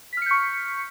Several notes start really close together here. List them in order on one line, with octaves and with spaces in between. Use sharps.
B6 F6 C#7 G6 C#6